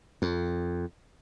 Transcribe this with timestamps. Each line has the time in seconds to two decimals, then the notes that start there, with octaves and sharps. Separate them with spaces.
0.22 F2